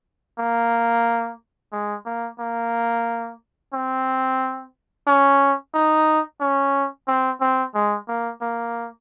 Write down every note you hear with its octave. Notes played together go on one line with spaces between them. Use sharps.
A#3
G#3
A#3
A#3
C4
C#4
D#4
C#4
C4
C4
G#3
A#3
A#3